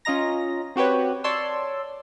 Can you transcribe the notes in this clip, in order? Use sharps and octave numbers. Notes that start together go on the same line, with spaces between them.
C#4 F4 D#5 A#5 A#6
C4 F#4 G4 B4 C#5
C#5 D5 A5 C6 E6